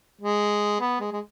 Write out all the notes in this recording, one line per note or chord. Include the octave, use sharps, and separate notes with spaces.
G#3
B3
G#3
G#3